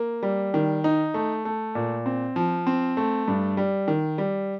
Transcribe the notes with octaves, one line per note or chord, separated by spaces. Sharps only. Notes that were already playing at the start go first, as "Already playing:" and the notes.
Already playing: A#3
G3
D#3
D#4
A3
A3
A#2
C4
F3
C4
A3
G2
G3
D#3
G3